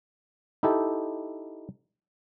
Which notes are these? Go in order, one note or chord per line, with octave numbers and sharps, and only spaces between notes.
D#4 E4 G4 A4